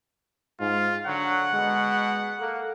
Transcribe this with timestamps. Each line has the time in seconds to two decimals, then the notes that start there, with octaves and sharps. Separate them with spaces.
0.60 G#2 F4
1.07 D3 F#3 F#5
1.53 B2 G#3
2.40 A#3 A4